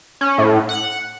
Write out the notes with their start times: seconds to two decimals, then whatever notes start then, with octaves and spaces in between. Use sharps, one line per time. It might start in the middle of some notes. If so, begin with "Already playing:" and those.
0.21 C#4
0.38 A2
0.69 F#5